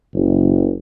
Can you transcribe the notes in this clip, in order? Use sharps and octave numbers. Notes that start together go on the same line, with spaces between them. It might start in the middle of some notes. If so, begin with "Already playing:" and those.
F#1